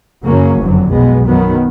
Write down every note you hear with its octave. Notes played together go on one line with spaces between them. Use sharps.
F#2 C#3 F#3 A#3 C#4
F#1 F2 D3 F#3
B1 B2 G#3 B3
F#2 D#3 F#3 B3